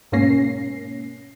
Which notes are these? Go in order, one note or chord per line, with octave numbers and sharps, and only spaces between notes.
G#2 B2 A#3 C#4 A#6 C7